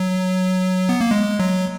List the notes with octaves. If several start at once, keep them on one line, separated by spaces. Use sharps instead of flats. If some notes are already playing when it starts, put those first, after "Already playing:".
Already playing: F#3
B3
A#3
G#3
F#3